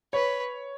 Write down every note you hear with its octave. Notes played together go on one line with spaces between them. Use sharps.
B4 C#5